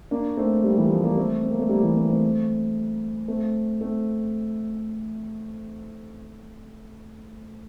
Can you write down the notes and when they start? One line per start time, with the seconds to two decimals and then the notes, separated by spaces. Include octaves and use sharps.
0.11 A#3 D4
0.37 A3 C4
0.64 G3 A#3
0.77 E3 G3
0.90 F3 A3
1.04 G3 A#3
1.17 A3 C4
1.43 C4
1.51 A#3
1.59 A3 C4
1.69 G3 A#3
1.83 E3 G3
1.96 A3 C4
2.09 A3 C4
3.28 A3 C4
3.81 A3 C4